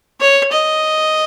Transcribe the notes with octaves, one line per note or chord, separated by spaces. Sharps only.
C#5
D#5